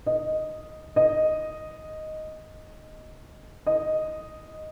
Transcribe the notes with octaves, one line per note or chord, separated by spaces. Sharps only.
D#5
D#5
D#5